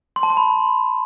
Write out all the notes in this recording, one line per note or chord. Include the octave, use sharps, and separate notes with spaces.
C6
A5
C6
B5